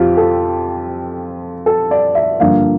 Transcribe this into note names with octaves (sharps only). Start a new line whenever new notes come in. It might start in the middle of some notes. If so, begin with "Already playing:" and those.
Already playing: F2 C4 F4 G4
A4
A4
D5
E5
G2 D3 F3 A#3 F5